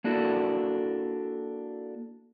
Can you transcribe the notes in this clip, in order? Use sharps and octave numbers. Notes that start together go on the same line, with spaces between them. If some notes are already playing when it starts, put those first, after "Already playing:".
A#3 D4 E4 F#4 A4